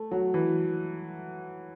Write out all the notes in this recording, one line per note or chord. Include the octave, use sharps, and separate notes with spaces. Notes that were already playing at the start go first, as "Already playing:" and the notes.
Already playing: A3
F#3
E3